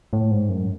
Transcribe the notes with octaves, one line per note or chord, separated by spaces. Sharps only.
A2
G#2
F#2